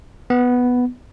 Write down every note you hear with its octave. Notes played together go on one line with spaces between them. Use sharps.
B3